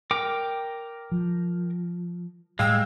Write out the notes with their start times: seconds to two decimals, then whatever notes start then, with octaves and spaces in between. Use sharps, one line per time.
0.11 A#4 G5 D6
1.12 F3
2.59 A2 G3 G#3 F5 G5 E6